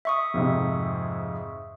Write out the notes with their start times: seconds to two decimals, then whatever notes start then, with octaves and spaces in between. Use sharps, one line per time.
0.05 E5 C#6 D#6
0.34 F2 G#2 C3